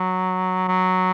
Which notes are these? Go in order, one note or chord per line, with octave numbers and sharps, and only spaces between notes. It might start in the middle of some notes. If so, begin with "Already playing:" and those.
Already playing: F#3
F#3